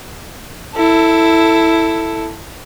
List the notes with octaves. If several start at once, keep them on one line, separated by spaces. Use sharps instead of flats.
E4 A4